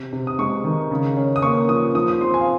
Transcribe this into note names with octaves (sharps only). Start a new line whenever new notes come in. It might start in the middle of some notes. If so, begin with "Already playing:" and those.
Already playing: C3
C3
D#6
G#3 C#6
D#3
C#3
C#4
D#6
A#3 C#6
F3 D#6
F3 D#6
D#6
C4 C6
G#5
F5